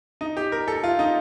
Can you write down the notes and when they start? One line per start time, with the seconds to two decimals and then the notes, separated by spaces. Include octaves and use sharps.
0.21 D#4
0.37 G4
0.52 A#4
0.68 A4
0.84 F4
0.99 D#4